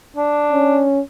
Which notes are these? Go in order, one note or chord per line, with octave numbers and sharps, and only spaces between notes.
D4
C#4